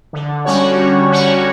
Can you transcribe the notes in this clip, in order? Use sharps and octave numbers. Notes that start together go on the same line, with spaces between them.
D3
G3 C#4 F#4 C#5
D3
G3 C#4 F#4 C#5